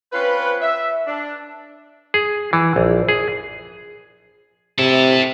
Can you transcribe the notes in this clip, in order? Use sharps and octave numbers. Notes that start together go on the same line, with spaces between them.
C4 C#4 F4 B4
E5
D4
G#4
E3
A#1
G#4
C3 E4 A4